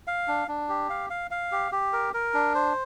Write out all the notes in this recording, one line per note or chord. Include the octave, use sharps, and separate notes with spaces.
F5
D4
D4
G4
F5
F5
F5
G4
G4
A#4
A#4
D4
C5